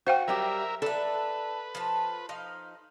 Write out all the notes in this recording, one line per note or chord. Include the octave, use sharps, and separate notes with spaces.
F#4 C5 F5 G5
F#3 G3 G4 A#4 E5
D4 A4 B4 E5
F3 A5
F3 D#4 F5